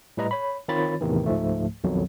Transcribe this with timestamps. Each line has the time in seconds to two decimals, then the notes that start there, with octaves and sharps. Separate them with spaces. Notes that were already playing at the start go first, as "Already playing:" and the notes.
0.17 A2 G3 B4 D#5 A#5
0.31 C#5 B5
0.68 D#3 C4 F4 C#5 B5 A6
1.01 E2 A2 C3 D#3 E3
1.26 C#2 G#2 F3 A3
1.84 B1 F2 B2 D#3 F#3